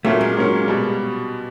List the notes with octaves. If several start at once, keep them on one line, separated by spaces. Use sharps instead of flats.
A#2 F#3 A3 A#3 C#4
G#3
A#2 F#3 A#3 C#4
B2 G3